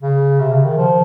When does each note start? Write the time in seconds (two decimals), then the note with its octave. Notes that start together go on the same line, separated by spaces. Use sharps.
0.01 C#3
0.40 C3
0.53 C#3
0.64 D#3
0.77 F3